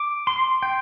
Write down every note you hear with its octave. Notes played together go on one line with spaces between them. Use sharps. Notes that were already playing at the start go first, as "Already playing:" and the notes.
Already playing: D6
C6
G5